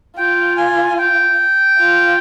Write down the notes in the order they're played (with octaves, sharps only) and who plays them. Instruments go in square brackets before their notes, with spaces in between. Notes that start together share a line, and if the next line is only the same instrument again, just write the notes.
[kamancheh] F4 [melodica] G5
[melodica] G#5
G5
[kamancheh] F4